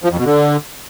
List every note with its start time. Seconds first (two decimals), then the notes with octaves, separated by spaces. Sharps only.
0.04 F3
0.11 F2
0.18 B2
0.25 D3